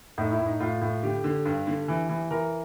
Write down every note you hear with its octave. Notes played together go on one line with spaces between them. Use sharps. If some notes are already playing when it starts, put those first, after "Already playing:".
A2 D#4
E4
A2
D#4
A2 F4
A2
D3 G4
D3
G2
D3
E3
E3
E3 A#4